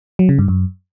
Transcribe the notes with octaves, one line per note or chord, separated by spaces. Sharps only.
F#3
C#3
G2
F#2